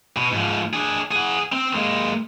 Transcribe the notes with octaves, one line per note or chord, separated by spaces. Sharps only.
B2
G#2 F3
D4 G#4
G#4 F#5
C4
G#3 A#3